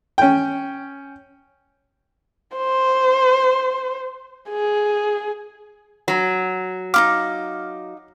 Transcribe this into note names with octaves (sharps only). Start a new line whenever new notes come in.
C#4 G5
C5
G#4
F#3
D#4 E4 F5 D6 F6